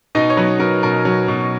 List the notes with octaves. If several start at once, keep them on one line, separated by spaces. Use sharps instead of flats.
B2 D#4 D#5
C#5
F#3 B3 B4
F#3 A#4
B2 A#4
F#3
B2